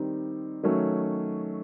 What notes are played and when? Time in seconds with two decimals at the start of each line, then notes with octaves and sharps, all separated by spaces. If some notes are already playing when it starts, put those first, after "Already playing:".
Already playing: D#3 G3 C4 D#4
0.63 D#3 F#3 A3 C#4